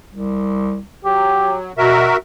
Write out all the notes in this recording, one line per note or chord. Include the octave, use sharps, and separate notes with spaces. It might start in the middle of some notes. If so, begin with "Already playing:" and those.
C2
F#3 G4
B2 F#4 A#4 E5